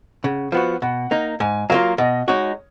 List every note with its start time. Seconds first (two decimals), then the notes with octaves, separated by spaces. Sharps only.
0.24 C#3 F#5
0.52 F3 B3 F#4 B4
0.82 B2 F#5
1.11 A#3 D#4
1.40 G#2 G#5
1.70 F#3 A#3 F4 F5
1.98 B2 D#5
2.27 G#3 D#4 F#4 C#5